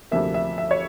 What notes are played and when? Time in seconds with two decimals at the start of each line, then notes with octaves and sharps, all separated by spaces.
0.11 D2 C3 F3 A#3 E5
0.34 E5
0.58 E5
0.71 C#5